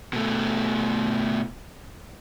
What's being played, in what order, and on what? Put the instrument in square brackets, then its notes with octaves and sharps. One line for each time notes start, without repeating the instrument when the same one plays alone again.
[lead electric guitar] B2 A3